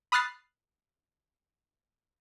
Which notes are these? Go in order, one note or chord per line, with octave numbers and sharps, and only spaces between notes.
B5 D#6 F6 F#6 A6 C7